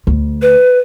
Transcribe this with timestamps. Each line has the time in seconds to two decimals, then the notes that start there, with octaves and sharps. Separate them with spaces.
0.07 D2
0.42 B4